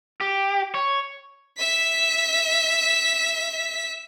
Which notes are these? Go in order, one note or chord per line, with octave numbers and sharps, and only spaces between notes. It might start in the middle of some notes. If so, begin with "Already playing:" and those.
G4
C#5
E5 B6